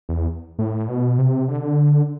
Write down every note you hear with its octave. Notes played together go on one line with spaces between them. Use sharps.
E2
A2
B2
C3
D3